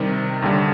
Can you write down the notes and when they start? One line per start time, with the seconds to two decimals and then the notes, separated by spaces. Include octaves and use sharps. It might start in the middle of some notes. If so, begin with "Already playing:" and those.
Already playing: C3 D#3 G3
0.42 D#2 D3 G3